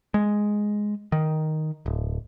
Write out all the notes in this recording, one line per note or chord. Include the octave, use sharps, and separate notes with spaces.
G#3
D#3
D1